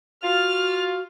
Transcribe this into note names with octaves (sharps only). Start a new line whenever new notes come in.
F4 F#4 F6